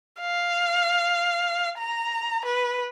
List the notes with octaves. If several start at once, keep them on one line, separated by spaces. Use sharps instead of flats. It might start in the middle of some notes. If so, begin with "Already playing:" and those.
F5
A#5
B4